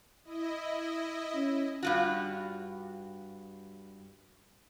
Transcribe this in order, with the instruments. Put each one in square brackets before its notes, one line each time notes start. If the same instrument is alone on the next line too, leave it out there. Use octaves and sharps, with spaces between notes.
[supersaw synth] E4 D#5
[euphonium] C#4
[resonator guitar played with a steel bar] G2 F4 F#4